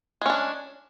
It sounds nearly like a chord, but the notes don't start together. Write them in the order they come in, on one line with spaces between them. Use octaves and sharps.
G#3 C#4 D4